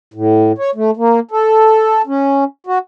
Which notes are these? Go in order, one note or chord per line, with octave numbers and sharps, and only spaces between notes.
A2
C#5
A3
A#3
A4
C#4
F#4